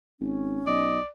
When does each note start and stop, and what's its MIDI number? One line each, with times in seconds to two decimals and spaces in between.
0.20 0.61 32
0.20 0.89 61
0.67 0.99 35
0.67 1.07 74
0.67 1.00 75